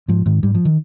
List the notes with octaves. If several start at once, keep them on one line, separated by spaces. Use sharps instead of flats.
G#2 F3
G#2 D#3
G#2 G3
F3
D#3